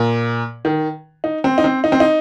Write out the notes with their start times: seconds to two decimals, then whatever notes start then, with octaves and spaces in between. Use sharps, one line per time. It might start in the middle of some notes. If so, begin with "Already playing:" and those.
Already playing: A#2
0.65 D#3
1.24 D#4
1.44 C4
1.58 D#4
1.64 C4
1.84 D#4
1.92 C4
2.00 D#4